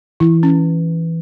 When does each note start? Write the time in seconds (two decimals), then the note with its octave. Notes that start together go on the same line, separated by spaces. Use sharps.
0.20 E3 E4
0.43 C#4